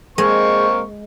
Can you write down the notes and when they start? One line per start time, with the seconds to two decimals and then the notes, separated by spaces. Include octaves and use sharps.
0.18 G#3 A#3 C4 C#6